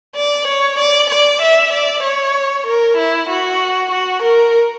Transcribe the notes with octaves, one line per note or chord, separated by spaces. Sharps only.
D5
C#5
D5
D5
E5
D5
C#5
A#4
E4
F#4
F#4
A#4